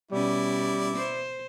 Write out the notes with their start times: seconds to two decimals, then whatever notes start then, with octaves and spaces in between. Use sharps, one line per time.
0.11 B2 G3 C#4 E4 D5
0.96 C5